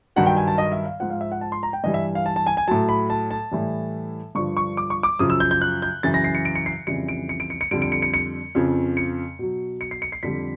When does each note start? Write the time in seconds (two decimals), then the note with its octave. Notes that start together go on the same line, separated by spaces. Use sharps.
0.16 G2 D#3 F#3 F#5
0.26 G5
0.37 G#5
0.48 A5
0.58 D#5
0.72 E5
0.86 F5
1.00 G#2 F3 F#5
1.10 F5
1.21 E5
1.32 F#5
1.41 A5
1.52 C6
1.63 A#5
1.73 G5
1.84 G2 E3 G3 D#5
1.94 E5
2.15 F5
2.26 A5
2.36 A5
2.47 G#5
2.57 G#5
2.68 A2 F#3 A5
2.89 B5
3.10 A5
3.31 A5
3.51 A2 E3 G3
4.35 G2 D3 F3 C#6
4.57 C#6
4.77 D6
4.90 C#6
5.03 D6
5.19 F#2 C#3 F3 D#6
5.30 E6
5.40 G6
5.51 G6
5.62 F#6
5.82 G6
6.03 F#2 C#3 E3 A6
6.14 A#6
6.24 C7
6.35 C#7
6.45 D7
6.55 C#7
6.66 C7
6.87 F2 C#3 E3 G3 C#7
7.09 D7
7.29 C#7
7.40 D7
7.50 C#7
7.61 C#7
7.71 F2 D3 G3 D7
7.82 D7
7.92 C#7
8.02 C#7
8.14 C#7
8.55 F2 C#3 F3
8.97 C#7
9.39 B2 F#3
9.81 C#7
9.91 C7
10.02 C#7
10.12 C7
10.23 F2 D3 G3 B6